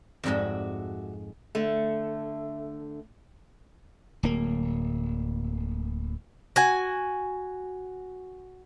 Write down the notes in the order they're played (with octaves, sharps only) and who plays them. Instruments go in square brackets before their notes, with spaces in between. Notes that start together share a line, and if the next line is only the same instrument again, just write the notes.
[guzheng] F2 G#2 G#3 [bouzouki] F#4 D5 E5
[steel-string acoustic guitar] D3 A3
[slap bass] D1 A#3
[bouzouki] F#4 G#5